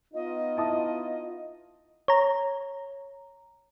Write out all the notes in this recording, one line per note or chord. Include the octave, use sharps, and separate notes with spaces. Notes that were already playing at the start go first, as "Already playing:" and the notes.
B3 D#4 F4 D#5
E4 A5 D#6
C#5 A#5